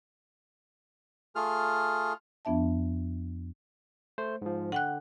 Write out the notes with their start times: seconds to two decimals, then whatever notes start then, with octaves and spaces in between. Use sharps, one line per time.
1.36 A3 F4 G#4 F6
2.45 F2 F3 B3 D4 E5 A5
4.18 A3 C5
4.42 G#2 F3
4.72 D3 F#5 G5 F#6